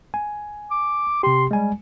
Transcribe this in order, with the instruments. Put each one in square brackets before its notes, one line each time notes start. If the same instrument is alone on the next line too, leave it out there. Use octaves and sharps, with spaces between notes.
[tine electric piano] G#5
[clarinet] D6
[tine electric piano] C3 G4 [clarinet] C6
[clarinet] G3 [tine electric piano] G#3 G#5